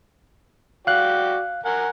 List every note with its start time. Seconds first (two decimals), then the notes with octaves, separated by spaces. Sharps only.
0.87 F#4 D5 F5 G5 F#6
1.65 A#4 F#5 G#5